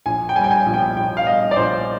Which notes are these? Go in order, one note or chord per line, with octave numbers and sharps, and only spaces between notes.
A#1 G#5
G5
G3 G#5
G5
G#5
A#1
G5
A#1 G5
F5
G3 D#5
D5
A#1 C5